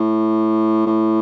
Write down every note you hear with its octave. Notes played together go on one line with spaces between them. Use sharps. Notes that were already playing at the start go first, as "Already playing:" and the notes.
Already playing: A2
A2